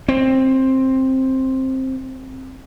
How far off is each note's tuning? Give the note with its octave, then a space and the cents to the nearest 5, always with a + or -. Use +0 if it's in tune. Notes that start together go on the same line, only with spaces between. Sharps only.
C4 +10